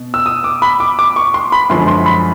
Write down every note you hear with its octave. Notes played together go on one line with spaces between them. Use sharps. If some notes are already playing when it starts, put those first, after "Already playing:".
Already playing: B2
E6
D#6
D6
B5
D6
D6
C#6
C6
B5
F#2 D3 F3 G#3 C6
C6
B5